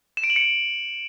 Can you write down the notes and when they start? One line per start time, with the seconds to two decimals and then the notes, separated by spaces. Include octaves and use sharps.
0.17 E7
0.24 D7
0.30 F#7
0.36 C#7